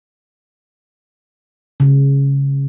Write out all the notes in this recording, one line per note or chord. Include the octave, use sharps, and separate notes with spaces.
C#3